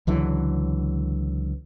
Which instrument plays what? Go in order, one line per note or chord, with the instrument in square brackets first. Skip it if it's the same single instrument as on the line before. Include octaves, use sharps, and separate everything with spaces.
[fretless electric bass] C#2 D3 E3 F#3